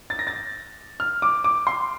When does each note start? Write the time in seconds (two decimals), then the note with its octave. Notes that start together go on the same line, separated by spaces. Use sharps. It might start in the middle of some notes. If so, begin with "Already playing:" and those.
0.10 A6
0.19 A#6
0.27 A6
1.00 F6
1.22 D6
1.44 D6
1.67 C6